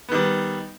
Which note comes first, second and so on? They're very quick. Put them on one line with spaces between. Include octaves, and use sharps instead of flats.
B3 D#3 G3